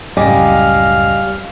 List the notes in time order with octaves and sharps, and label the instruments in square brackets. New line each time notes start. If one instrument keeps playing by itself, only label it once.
[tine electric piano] C#2 F#2 A2 [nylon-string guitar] G3 [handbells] D#5 G#5 D6 [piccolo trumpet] F5